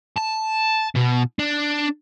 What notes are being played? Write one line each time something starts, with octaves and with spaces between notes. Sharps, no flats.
A5
B2
D4